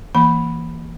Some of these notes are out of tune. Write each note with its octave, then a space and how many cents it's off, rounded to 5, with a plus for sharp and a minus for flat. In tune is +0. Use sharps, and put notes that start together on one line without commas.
E3 +5 A#3 +0 B5 -5